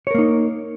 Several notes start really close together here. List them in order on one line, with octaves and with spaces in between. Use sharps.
C#5 A#4 A#3 D#4